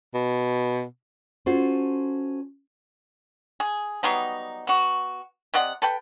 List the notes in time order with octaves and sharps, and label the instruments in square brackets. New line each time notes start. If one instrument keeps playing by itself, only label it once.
[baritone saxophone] B2
[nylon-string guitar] C#4 F4 F#4 A4 C5
[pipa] G#4
F#3 G3 B3 D#4
B3 F#4
C3 D5 D#5 F#5
A4 B4 G5